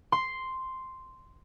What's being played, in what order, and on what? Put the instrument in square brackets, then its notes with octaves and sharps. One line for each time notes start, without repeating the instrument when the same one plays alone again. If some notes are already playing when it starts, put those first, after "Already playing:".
[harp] C6